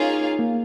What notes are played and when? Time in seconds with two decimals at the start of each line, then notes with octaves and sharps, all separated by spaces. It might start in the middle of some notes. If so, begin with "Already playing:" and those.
Already playing: A#3 C#4 D#4 F4 G#4 F5
0.39 A#3